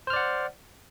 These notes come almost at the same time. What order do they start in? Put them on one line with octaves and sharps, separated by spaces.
C5 F6 D5 F#5